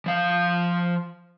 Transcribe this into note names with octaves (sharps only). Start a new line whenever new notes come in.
F3 F5